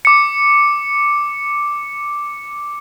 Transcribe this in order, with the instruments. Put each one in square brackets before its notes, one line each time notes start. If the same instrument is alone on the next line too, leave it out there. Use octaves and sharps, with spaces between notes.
[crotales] D6 C#7